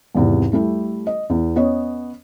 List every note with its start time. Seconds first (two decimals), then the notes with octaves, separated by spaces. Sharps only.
0.15 G#1 E2 C3
0.52 G3 A3 E4 G4
1.07 D#5
1.30 E2
1.56 B3 C#4 C#5 D#5